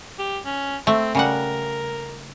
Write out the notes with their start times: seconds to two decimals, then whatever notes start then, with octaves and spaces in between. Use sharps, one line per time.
0.19 G4
0.45 C#4
0.87 A3 C4
1.15 C#3 G3 A#4 F#5